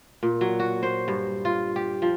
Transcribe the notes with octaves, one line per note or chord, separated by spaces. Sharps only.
A#2
F#3
F#4
C5
G2
F4
G4
F3